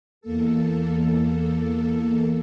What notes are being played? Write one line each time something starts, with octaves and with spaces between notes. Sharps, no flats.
E2 A#3 A4